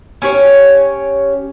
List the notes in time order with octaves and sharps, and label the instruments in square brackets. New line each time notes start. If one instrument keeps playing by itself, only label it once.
[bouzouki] C#4 G4 C#5